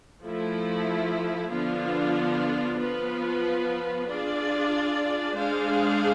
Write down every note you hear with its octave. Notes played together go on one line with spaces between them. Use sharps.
F3 A3 E4
D3 F3 B3 D4 F4
F3 B3 F4 B4
D4 F4 G#4 D5
G#3 D4 G#4 C5 F5